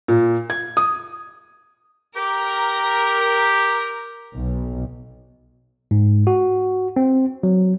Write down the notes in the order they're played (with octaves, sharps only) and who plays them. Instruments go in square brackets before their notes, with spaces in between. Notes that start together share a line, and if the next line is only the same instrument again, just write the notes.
[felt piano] A#2
G#6
D#6
[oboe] G4 [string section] A#4
[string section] B1
[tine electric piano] G#2
F#4
C4
F#3